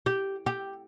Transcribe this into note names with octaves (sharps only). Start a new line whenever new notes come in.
G4
G4